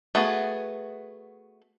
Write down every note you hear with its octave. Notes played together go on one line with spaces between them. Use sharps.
A3 B3 F#4 G#4